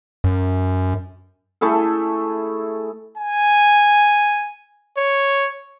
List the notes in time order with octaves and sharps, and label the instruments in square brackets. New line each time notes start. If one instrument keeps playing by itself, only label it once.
[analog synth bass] F#2
[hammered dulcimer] A3 E4 G#4 A4
[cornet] G#5
C#5